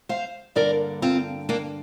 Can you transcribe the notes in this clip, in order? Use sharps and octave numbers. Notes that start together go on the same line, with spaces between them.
C5 F5
G2 D3 A#3 A#4 D5
C4 F4
A#3 D4